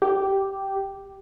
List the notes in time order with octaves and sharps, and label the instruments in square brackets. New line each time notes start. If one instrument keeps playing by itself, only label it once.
[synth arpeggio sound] G4